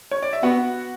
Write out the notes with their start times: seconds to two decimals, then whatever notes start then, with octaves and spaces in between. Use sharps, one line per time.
0.11 C#5
0.22 D5
0.33 E5
0.43 B3 F#4 F#5